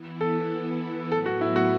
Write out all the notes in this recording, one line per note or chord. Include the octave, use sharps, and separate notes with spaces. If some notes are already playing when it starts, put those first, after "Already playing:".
Already playing: E3 B3 E4
A4
A2 F#3 B3 A4
F#4
E4
F#4